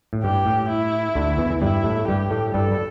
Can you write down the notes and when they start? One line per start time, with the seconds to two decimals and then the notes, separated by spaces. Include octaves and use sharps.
0.13 A2
0.23 G2 G4
0.46 A2
0.69 E4
1.15 D2 D3
1.38 E2 E3
1.50 E3
1.62 G2 G3 E4
1.84 A2 A3
1.99 A3
2.08 G2 G3 G4
2.30 A2 A3
2.54 G2 G3 A4
2.71 G3